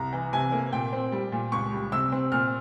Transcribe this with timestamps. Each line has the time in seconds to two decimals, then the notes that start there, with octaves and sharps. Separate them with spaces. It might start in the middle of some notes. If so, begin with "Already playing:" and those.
Already playing: C2 A#5
0.13 E3
0.33 C3 G#5
0.52 A#3
0.72 A#2 G5
0.93 C4
1.12 G3
1.32 A#2
1.52 C#2 C#6
1.72 G3
1.92 C3 E6
2.12 C4
2.32 A#2 F6